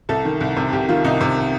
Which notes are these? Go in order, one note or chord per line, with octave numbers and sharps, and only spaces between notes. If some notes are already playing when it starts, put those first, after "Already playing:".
C2 A4
D#3
C2
C3
C2 G4
D#3 F4
C2 D#4
C3